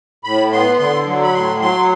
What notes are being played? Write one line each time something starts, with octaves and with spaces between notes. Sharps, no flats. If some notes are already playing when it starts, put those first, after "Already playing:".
A2 B5
B3 C6
D3 C6
F#3
B5
A2 C6
F#3 C6